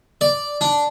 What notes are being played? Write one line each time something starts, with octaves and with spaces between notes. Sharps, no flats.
D5
D4